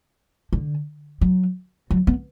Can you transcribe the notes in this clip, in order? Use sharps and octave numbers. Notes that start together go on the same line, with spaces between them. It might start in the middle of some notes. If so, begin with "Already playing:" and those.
D3
F#3
F#3
B3